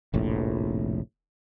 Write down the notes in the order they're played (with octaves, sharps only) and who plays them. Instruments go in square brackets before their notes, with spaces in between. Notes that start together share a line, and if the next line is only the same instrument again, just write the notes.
[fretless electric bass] F1 A#1 A2